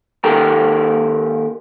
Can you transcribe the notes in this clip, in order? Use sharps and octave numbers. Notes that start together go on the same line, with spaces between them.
D#2 D#3 G4 A4 A#4